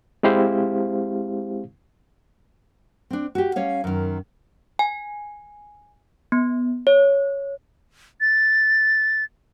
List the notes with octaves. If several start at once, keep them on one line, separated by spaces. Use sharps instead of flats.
G#3 C4 E4 G4 C5 F5
C4 D4
F#4 G4
G3 C#4 C#5 F5
F#2 D#3
G#5
B3
C#5
A6